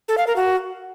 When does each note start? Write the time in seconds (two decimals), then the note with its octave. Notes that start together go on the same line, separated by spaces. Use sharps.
0.08 A4
0.18 F5
0.27 A#4
0.36 F#4